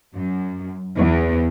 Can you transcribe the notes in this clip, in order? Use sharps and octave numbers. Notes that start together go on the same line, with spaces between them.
F#2
E2